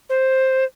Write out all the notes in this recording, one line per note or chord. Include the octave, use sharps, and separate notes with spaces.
C5